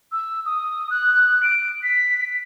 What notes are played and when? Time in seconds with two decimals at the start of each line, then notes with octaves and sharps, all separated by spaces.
0.12 E6
0.46 D#6
0.90 F#6
1.43 D7
1.83 B6